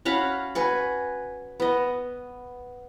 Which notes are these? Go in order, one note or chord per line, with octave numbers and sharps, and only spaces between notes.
C#4 F#4 F5 B5
F#4 B4 G#5
B3 D#5